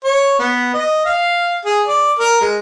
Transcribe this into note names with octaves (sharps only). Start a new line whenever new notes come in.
C#5
B3
D#5
F5
G#4
D5
A#4
G#3